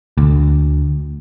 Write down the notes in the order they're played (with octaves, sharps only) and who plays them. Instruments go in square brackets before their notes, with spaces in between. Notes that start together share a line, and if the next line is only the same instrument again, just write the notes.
[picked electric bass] D2